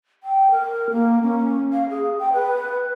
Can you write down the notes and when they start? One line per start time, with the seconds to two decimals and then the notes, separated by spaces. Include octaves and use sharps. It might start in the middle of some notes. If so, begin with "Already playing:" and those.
0.23 G5
0.51 A#4
0.91 A#3
1.22 C#4
1.73 F5
1.89 G#4
2.19 G5
2.33 B4